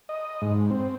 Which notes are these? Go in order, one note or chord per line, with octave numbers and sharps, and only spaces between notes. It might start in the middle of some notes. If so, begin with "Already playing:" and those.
D#5
G#2
C4